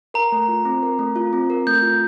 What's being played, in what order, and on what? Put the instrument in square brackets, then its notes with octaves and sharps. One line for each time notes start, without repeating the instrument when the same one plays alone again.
[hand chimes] A#4 [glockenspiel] A#5
[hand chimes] A3
F4
C4
A#4
A3
F4
C4
A#4
[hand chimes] A3 [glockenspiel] G6
[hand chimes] F4